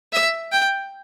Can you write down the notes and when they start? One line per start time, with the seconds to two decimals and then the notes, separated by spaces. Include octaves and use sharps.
0.13 E5
0.52 G5